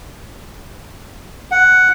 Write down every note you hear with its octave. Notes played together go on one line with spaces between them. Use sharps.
F#5